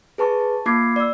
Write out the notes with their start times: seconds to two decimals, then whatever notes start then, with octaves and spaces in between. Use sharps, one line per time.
0.18 G#4 B4 A5 C#6
0.40 A5
0.66 A#3 F4 D6 G#6 C7
0.96 D5 E6